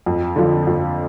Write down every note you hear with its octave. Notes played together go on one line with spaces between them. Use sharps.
F2
D3 F3
F2